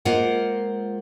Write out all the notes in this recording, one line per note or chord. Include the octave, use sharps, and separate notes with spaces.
G#3 A#3 F4 A#4 C5 F#5